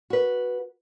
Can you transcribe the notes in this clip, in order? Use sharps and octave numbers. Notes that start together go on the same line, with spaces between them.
F#4 B4